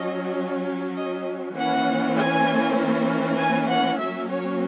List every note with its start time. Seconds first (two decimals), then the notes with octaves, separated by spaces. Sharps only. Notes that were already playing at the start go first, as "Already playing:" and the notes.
Already playing: F#3 C#4 D#5
0.96 D#5
1.57 E3 A#3 C#4 F#5
2.17 G#5
3.38 G#5
3.69 F#5
3.99 F#3 A#3 C#4 E5
4.29 C#5